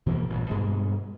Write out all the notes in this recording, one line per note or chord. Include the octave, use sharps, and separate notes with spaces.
B2 E3 F3 A#3
A1 G2 A#2
G2 B2 G#3